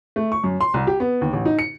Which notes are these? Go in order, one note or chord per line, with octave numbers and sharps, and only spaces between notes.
A3
C#6
F#2
C6
C2
G4
B3
D#2
A1
D#4
C#7